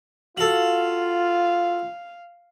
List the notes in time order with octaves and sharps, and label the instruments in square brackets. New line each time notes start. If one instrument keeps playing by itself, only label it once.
[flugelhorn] F4 [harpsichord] F#4 A4 [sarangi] F5